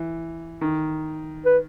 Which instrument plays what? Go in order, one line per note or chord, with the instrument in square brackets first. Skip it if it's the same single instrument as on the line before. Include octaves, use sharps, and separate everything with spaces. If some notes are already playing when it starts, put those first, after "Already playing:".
Already playing: [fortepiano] E3
D#3
[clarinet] B4